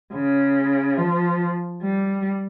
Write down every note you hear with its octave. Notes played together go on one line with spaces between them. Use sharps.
C#3
F3
G3